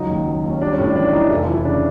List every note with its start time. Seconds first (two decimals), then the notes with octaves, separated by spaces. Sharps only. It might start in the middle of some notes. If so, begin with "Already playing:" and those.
Already playing: C#2 F#3 D#4
0.08 D#2
0.25 F#3
0.43 D#2
0.50 C#4
0.60 G3 D4
0.72 C#4
0.78 A2
0.84 D4
0.95 E3 D4
1.13 E3 D#4
1.30 F1 E4
1.42 F4
1.48 E3
1.54 E4
1.65 C#3 D4